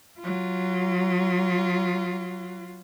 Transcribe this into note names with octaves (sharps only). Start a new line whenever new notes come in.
F#3 F4